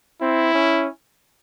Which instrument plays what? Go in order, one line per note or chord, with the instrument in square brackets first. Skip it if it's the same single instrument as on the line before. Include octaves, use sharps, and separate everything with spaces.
[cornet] C4 [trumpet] E4
[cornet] C#4